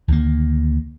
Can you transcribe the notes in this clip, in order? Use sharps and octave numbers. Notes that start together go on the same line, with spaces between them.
D2 D#3 G#3 A#3